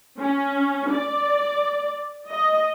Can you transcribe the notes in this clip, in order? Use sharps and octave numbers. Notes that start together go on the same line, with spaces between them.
C#4
D5
D#5